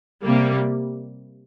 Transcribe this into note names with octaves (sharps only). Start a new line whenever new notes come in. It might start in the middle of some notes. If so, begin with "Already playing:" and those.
C3 G3 A#3